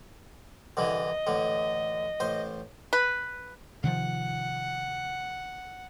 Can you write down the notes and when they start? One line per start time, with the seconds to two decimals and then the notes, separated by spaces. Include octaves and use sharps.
0.77 C2 D3 E3 D#5
1.27 A1 D3
2.20 A1 C5
2.93 B4
3.84 C3 D#3 F3 F#5